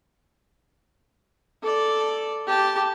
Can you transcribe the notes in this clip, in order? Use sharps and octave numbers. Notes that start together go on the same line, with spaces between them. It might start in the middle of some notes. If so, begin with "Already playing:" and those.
A4 D5
G4 A5